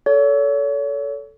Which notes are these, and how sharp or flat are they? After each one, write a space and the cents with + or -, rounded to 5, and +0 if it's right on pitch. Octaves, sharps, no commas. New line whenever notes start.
A4 +0 C#5 +35